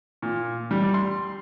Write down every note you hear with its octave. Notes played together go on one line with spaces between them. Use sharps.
A#2
G3
C6